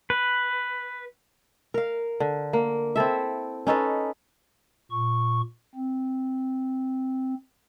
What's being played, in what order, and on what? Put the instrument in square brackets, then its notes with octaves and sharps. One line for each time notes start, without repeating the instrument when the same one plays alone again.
[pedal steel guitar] B4
[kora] A#4 F5
D3
A#3
C4 E4 A4 E5
C#4 D#4 A4 B4
[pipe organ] A#2 C#6
C4